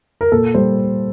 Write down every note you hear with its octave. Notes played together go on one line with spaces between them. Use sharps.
A#4
A#2 A4
G3 C5